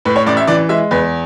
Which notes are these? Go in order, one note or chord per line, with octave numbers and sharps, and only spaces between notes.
A2 B4
C#5
A1 D5
E5
E3 D5
G#3 E5
E2 B4